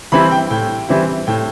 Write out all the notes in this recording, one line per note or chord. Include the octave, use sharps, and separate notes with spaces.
E3 G3 C4 E4 B5
G5
A2 G5
E3 G3 C4 E4
A2 G5